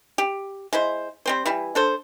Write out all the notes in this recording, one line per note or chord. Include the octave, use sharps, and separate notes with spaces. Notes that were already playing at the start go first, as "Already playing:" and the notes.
G4
G#3 E4 C5
G3 C4 C5
E3 G3 E4
D4 A4 C5